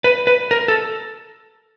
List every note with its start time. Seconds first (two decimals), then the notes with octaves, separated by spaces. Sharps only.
0.04 B4
0.27 B4
0.51 A#4
0.68 A4